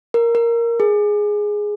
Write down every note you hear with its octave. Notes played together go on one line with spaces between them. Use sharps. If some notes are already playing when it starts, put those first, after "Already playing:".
A#4
A#4
G#4